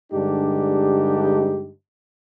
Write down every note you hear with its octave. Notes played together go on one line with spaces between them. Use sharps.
G2 D3 G#3 D4 D#4 G4